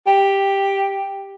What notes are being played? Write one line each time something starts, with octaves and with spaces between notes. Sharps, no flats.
G4